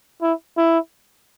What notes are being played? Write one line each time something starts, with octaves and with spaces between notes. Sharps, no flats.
E4
E4